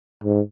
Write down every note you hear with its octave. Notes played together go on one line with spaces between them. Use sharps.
G#2